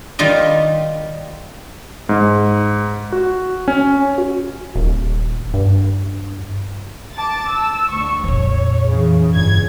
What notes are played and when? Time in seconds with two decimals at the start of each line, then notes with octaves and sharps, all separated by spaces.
0.19 D#3 G3 F4 D#5
2.09 G#2
3.12 F#4
3.68 C#4
4.18 F#4
4.75 D#1
5.54 G2
7.15 A5 D6 A6
7.48 E6
7.90 D2 C#6
8.24 F2 A#2 C#5
8.88 F#2 C#3 E3
9.30 G1 C#3 G#6